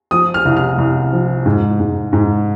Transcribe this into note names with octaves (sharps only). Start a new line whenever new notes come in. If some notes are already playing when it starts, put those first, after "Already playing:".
F3 D#6
F6
C2
F6
C2
F3
G#2
G#2
G#2